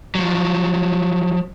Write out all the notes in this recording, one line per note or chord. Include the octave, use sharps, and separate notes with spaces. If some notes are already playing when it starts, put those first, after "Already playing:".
F3 F#3